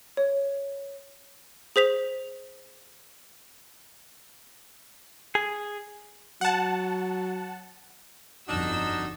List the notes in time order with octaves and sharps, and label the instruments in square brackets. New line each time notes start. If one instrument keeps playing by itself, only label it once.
[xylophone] C#5
G#4 C5 B6 F7
[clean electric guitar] G#4
[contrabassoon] F#3 [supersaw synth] F#5 A5
[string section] G1 F2 E6 [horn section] D4 D#4 F#4